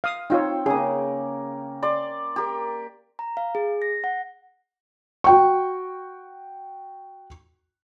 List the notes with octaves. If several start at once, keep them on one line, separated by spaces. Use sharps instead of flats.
F5 D#6
C4 D#4 F4 C#5 G5
C#3 A#3 G#4
D5 C6
G4 A#4
A#5
F5
G#4
A#6
F#5
F#4 G5 C#6